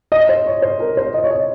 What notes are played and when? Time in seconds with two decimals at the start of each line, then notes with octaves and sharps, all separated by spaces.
0.12 D#5
0.29 C5
0.46 C#5
0.62 C5
0.80 A#4
0.97 C5
1.14 D#5
1.24 C#5
1.30 D#5